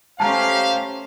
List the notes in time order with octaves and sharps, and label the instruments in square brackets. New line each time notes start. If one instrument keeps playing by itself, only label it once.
[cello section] A3 C#4 G4 [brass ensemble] C5 F5 [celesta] A5 A#5